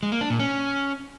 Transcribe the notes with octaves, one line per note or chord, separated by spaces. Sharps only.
G#3
A#3
D4
A#2
C#4